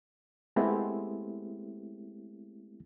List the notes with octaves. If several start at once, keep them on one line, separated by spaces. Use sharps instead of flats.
G#3 A3 B3 C4 E4 G4